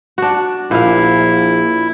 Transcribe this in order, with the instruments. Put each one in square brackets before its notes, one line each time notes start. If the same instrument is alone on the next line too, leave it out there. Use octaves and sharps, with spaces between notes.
[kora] D4 F#4
[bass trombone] A#1 [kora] A#2 F5 [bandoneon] E4